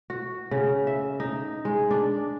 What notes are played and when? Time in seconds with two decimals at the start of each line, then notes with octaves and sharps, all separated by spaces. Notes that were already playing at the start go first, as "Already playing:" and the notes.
0.10 F#4
0.51 C#3
0.87 E5
1.20 D#4
1.65 G#3
1.91 D4